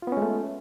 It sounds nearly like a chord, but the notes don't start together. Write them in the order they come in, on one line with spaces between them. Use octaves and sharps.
F4 B3 C#4 G#3 A3